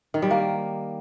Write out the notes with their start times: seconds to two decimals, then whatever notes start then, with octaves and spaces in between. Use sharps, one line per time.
0.14 D#3
0.22 G3
0.31 A#3